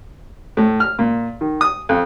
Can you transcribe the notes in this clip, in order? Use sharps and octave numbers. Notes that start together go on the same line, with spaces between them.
A2
F6
A#2
D#3
D#6
F2